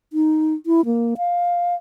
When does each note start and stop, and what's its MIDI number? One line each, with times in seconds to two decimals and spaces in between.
0.13 0.54 63
0.66 0.85 64
0.85 1.14 58
1.18 1.75 77